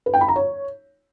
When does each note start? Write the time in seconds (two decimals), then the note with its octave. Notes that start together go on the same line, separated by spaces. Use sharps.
0.06 B4
0.14 G5
0.21 B5
0.28 A#5
0.36 C#5